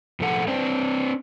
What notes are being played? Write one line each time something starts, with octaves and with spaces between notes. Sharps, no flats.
A2 F3 A4 F#5
C4 D4 C5